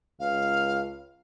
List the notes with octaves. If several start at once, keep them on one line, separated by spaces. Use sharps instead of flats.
C#2 F5